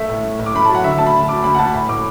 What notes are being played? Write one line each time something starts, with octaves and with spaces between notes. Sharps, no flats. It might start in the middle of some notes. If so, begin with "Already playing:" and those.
Already playing: A3 E5
A2
A3
A2
D6
A3 B5
F#3 A5
F#5
D3 E5
D2 A5
B5
D3
D2 D6
D2 B5
F#5
D2 A5
A2 B5
A2 D6